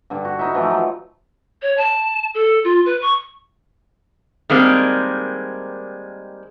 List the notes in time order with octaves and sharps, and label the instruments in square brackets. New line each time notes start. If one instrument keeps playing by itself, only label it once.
[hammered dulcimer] G2 D3 G3
F#4
D#4 E4 E5
E3 F3 A3 D#4
F#3
[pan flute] C#5
A5
A4
F4
B4
C#6
[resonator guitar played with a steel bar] D#3 G3 G#3 A#3 C4 D4